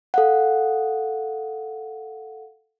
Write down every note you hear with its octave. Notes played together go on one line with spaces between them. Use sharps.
A4 F5 F#5